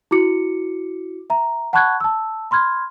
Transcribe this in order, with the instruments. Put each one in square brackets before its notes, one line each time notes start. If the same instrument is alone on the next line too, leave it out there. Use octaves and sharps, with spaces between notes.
[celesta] E4 F#4 D6 C#7
E5 A#5
F#5 A5 B5 C#6 F#6 G#6
A5 E6
B5 C6 F6 G#6